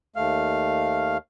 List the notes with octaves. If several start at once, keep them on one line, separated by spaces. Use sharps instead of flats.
D#2 A3 F5 F6